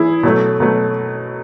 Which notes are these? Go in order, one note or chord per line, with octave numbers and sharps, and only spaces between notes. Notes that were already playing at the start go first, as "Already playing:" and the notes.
Already playing: E3 E4 G#4
B2 F#3 A3
B2 F#3 A3